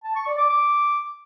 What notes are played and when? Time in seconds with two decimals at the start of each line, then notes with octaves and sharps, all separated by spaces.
0.04 A5
0.15 C#6
0.27 D5
0.38 D6
0.50 D6